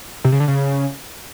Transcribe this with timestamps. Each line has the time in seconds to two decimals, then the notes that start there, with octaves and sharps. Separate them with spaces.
0.25 C3
0.32 C#3
0.40 D3
0.48 C#3